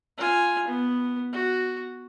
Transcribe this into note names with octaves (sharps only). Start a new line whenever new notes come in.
F4 G#5
B3
F#4